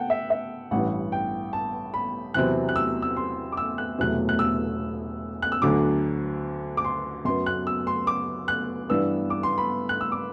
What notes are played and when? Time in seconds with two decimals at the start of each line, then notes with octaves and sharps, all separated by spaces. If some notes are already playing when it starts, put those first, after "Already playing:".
Already playing: F#5 G5 A5
0.10 E5
0.30 E5
0.71 A1 G2 E3 F#5
1.12 G5
1.53 A5
1.94 B5
2.34 E2 C3 F#3 C4 F#6
2.69 F#6
2.76 E6
3.02 E6
3.17 C6
3.52 D6
3.57 E6
3.78 F#6
3.98 E1 E2 C3 F#3 A3 F#6
4.29 F#6
4.39 E6
5.42 F#6
5.52 E6
5.62 D2 D3 F#3 D6
6.77 D6
6.85 C6
7.25 F#2 F#3 B3 C6
7.46 F#6
7.67 E6
7.87 C6
8.07 D6
8.48 F#6
8.89 G2 E3 B3 D4 E6
9.30 D6
9.43 C6
9.58 B5
9.89 F#6
10.01 E6
10.12 D6